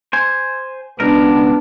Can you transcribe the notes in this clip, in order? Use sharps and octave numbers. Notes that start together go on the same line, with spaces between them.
C5 G#5
C#2 B2 B3 D4 A#4